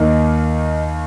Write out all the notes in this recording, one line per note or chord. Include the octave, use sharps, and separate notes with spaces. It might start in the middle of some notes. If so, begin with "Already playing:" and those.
Already playing: D#2 D#3 A#3 D#4 A#4 D#5